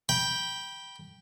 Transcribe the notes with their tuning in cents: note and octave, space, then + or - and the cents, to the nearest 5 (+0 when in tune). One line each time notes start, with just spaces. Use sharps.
G5 +0 B5 -25